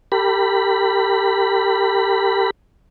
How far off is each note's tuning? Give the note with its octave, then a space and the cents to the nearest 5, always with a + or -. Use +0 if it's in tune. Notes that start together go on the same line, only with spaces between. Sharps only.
G4 +0 A#4 -45 B5 +0